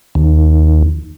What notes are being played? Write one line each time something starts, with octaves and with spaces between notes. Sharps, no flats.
D#2